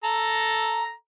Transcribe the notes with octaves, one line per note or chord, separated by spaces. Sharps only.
A4 A#5